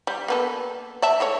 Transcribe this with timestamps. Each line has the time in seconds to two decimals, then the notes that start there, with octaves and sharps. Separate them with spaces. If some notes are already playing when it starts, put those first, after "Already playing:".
0.07 G3
0.28 A#3 B3 A4
1.02 D5 E5 A5
1.20 G#3 A3 C#5